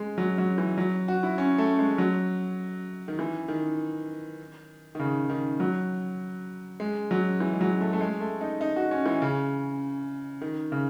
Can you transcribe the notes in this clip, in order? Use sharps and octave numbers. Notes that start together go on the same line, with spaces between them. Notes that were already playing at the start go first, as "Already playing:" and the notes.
Already playing: G#3
F#3
F#3
E3
F#3
F#4
E4
C#4
A3
G#3
F#3
D#3
E3
D#3
D#3
C#3
D#3
F#3
G#3
F#3
E3
G#3
F#3
A3
A3
G#3
A3
D#4
D#4
F#4
C#4
E3
C#3
D#3
C#3